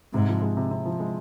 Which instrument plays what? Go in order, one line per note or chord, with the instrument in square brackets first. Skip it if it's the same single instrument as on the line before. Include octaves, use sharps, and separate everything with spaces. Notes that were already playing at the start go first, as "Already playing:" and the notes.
[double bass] G#2 [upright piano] C3
[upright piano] F3
G#3
C3
C3
F3
G#3